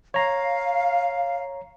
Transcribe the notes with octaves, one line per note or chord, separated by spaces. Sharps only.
C#5 F5 A#5